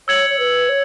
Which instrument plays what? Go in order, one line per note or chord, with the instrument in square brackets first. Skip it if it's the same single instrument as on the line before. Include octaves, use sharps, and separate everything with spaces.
[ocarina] C#5 [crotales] E6 G#6 C#7 F#7
[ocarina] C#5
B4
C#5